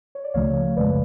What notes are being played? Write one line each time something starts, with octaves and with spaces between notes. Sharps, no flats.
C#5
D5
C#2 C#3 F3 A3 C#5 F5
G#1 F#2 C#3 G#3 B4 D5